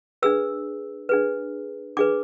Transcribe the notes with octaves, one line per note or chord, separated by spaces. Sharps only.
D4 G#4 B4 E6
D4 G#4 B4
D4 G#4 B4 D6